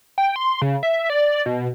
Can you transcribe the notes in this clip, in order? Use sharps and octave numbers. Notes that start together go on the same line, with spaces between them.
G5
C6
C#3
E5
D5
B2